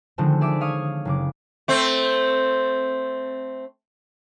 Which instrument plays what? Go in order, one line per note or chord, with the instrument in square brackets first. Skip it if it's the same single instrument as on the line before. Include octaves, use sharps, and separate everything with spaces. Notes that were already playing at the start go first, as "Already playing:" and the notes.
[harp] D3 D#3 F3 G#3 A3 C4
G#4 D5 E5 D6
C#5 F5 D#6 G#6
F#1 C#3 D6
[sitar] A3 C4